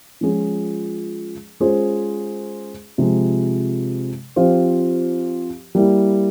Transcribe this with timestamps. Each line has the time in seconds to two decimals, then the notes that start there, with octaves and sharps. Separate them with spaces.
0.21 F3 G#3 C#4 F4 G#4
1.60 G#3 C#4 F4 G#4 C5
2.98 C3 F3 G#3
4.36 F3 C4 G4 C5 F5
5.75 G3 A#3 E4 G4